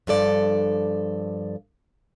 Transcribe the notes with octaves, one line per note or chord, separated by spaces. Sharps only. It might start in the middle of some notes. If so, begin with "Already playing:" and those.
G2 F3 A4 D5